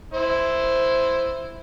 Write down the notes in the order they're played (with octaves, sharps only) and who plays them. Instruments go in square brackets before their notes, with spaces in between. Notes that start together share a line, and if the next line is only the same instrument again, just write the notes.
[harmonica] E4 C5